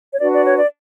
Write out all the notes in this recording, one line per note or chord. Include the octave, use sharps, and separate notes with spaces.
C#5
D4 F#4 B4 D5
D5
C#5
D5